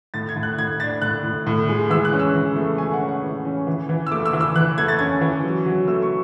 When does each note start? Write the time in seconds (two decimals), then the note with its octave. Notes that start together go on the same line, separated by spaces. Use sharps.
0.14 A2 A6
0.29 G#6
0.36 A2
0.43 F#6
0.59 A2 G#6
0.80 D4 A6
1.02 A2 F#6
1.24 A2
1.47 A2
1.69 G#3
1.90 E3 E6
2.05 F#6
2.13 C#4
2.19 E6
2.35 E3
2.56 A3
2.78 A3 G#5
2.93 F#5
3.01 C#4
3.08 F#5
3.23 E3
3.45 C#4
3.67 E3
3.89 E3
4.06 E6
4.12 A3 D6
4.25 E6
4.33 E3
4.40 E6
4.55 E3 F#6
4.78 A3 G#6
4.88 A6
4.99 C#4 G#6
5.21 E3
5.44 F#3
5.66 F#3
5.88 A3 E6
6.02 C#6